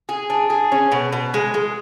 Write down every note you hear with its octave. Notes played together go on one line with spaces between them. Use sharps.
G#4
D4
G#4
C#4
B2
B2
G#3
G#3